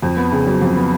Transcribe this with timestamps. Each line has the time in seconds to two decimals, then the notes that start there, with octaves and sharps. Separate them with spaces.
0.02 F2
0.17 B3
0.32 C#3
0.46 F#3
0.62 F2
0.76 B3